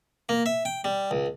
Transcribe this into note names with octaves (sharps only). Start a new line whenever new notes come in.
A#3
E5
G5
G3
C#2